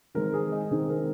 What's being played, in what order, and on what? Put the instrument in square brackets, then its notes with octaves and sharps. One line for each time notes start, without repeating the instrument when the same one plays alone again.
[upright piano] D#3 G#3 C4 [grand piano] A#4
[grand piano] G#4
D#4
[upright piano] D#3 G#3 C4 [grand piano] G#4
[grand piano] A#4